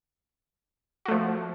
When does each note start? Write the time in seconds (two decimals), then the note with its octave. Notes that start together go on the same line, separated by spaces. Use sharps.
1.05 F#4
1.08 A3
1.11 F3